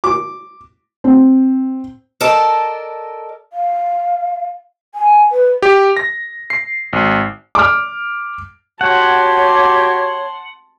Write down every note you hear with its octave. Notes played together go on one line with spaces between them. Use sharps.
D6
C4
A4 A#4 D5 D#5 A5
F5
G#5
B4
G4
A#6
C7
G#1
D6 F6
F#4 G4 C#5 F#5 A5 C6